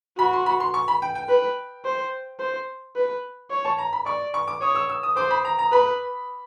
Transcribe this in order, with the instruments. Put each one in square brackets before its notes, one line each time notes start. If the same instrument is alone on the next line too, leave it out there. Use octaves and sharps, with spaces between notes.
[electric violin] F#4 [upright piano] B5
[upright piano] C6
B5
C6
C#6
B5
G5
G5
[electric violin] B4
C5
C5
B4
C#5
[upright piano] A5
A#5
B5
[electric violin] D5 [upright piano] C#6
[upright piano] C#6
D6
[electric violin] C#5 [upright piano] D#6
[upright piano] E6
E6
D#6
[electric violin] C5 [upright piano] D6
[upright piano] B5
A#5
A#5
[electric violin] B4 [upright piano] B5